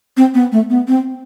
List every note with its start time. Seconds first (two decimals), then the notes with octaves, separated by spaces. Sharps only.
0.17 C4
0.34 B3
0.52 A3
0.70 B3
0.88 C4